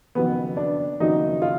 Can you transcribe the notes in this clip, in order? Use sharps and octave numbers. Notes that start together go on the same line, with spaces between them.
F#1 F2 D#3 F#3 B3
D4
F#1 F2 D#3 F#3 D#4
F4